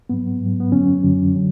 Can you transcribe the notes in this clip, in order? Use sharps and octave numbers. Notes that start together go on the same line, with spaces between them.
G#2 F#3 B3
G#2
F#3
B3
F#2 D3 F#3 C#4
F#2 D3 F#3
D3 F#3